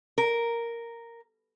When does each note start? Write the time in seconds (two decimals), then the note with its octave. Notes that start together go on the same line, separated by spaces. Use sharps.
0.18 A#4